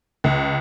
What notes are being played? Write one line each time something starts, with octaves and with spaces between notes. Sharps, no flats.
C#2